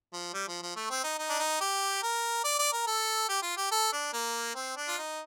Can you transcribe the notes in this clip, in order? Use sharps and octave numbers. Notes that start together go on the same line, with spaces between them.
F3
G3
F3
F3
A3
C4
D#4
D#4
D4
D#4
G4
A#4
D5
D5
A#4
A4
G4
F4
G4
A4
D4
A#3
C4
D4
F4
D#4